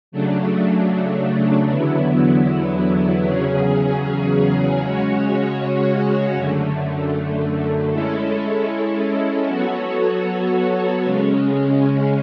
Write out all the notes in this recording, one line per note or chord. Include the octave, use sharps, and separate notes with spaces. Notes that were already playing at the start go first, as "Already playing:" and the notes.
C#3 F#3 A3 D4
E2 D3 F#3 B3 E4
E2 C#3 F#3 C#4 G#4
C#3 G#3 C#4 F#4 C#5
F#2 D3 A3
G#3 C#4 E4 A4
F#3 B3 F#4 A4 C#5
C#3 G#3 C#4